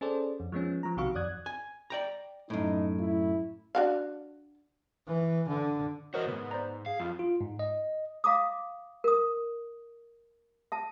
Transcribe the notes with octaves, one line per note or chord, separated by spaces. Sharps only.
C#4 G#4 A4 C5 D5
F2
F3 G#3 B3 C#4
F3 A#5
B1 C3 D#3 F#4 F5 C#6
F2 D5 D#6 F#6 G#6
G#5
D5 G5 A#5
F#2 A2 D#4
E4
D4 F#4 F5
E3
D3
E2 F#4 A#4 C5 C#5 D#5
C2 G#2 B3
C5 D5 A#5
G#4 F5
F2 F4
F4
G#2
D#5
E5 F5 A#5 D6 D#6
A#4 D#6
E5 A5